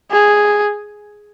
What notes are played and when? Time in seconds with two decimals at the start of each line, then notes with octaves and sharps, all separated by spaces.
0.11 G#4